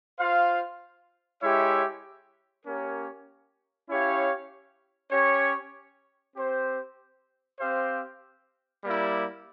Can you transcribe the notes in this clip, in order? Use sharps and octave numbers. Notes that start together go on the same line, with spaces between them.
F4 C5 F5
G#3 E4 G4 C#5 E5
A#3 C#4 G4 A#4 C#5
C#4 E4 G4 C#5 F5
C#4 G4 C#5
C4 G4 C5
C4 G4 C5 F5
G3 A#3 E4